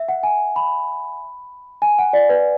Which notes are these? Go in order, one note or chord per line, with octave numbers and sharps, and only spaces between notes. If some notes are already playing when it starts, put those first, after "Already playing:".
Already playing: E5
F#5
G#5
B5
G#5
F#5
D5
B4